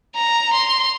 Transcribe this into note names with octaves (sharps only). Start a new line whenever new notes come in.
A#5
C6